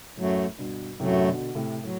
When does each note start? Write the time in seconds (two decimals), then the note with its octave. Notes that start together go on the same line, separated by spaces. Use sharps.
0.17 F#2 A2 F#3 A3
0.58 G2 B2
1.00 F#2 A2 C3 F#3 A3
1.28 B2 D3
1.55 A2 C3
1.84 A2 F#3